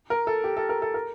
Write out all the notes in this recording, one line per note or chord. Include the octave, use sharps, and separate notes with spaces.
A#4
A4
G4
A4
A#4
A4
A#4